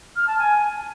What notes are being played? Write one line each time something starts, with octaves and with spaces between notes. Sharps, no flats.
F6
A5
G#5